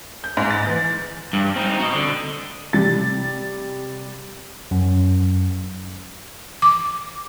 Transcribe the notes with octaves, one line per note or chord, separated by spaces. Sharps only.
G6
G#2
A6
E3
G2
C4 D#4
F#4 D#5
D3
C3 G3 A6
F#2
D6